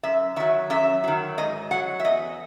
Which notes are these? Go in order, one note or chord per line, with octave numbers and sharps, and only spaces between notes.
F#2 E5
D#3 F#3 E5
F#2 E5
D#3 F#3
G#2 D#5
F#3 F#5
E5
E2 D#5